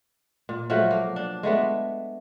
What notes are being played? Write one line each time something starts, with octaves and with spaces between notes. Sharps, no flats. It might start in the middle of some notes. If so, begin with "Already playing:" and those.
A#2
F3 F#3 G#3 A3
A#3
D4
G#3 A3 B3 D4